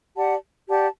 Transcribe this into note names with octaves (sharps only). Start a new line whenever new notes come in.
G4 D5 F#5 A5
G4 D5 F#5 A5